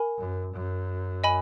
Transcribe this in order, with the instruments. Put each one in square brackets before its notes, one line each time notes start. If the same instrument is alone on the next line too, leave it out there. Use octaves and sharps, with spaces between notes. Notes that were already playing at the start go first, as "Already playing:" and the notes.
Already playing: [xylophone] A#4 G#5 B5
[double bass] F#2
F#2
[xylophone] D#5 G#5 B5